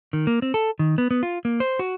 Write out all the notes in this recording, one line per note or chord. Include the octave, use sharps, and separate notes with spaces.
D#3
A#3
C4
A4
D#3
B3
B3
F4
A#3
C5
F#4